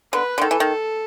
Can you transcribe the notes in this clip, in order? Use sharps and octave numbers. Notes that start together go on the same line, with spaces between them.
D3 B4
D3
D#3 A4
E3
D#3